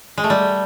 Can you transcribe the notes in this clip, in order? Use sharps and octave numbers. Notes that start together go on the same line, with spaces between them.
G#3
A3
G3